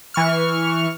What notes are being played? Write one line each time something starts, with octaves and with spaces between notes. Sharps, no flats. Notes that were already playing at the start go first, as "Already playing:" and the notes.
E3 C#6 F6